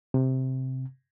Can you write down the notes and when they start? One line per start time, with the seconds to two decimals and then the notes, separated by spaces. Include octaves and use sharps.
0.14 C3